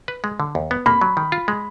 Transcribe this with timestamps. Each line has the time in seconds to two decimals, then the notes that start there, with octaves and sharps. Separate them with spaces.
0.08 B4
0.24 G#3
0.40 D3
0.55 D#2
0.71 B3
0.86 A#3 B5
1.01 F#3
1.17 D#3
1.32 F4
1.48 G#3